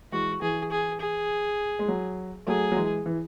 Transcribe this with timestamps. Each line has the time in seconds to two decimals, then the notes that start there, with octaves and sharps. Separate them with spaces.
0.12 E3 G#3 F#4
0.42 E3 G#4
0.72 G#4
1.00 G#4
1.79 G#3
1.88 F#3
2.47 F#3 A3 G#4
2.72 F#3
2.76 E3 G#3
3.06 E3